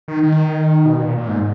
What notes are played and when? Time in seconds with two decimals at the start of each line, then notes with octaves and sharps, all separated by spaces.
0.08 D#3
0.23 D#3
0.86 B2
1.01 A#2
1.17 A#2
1.28 G#2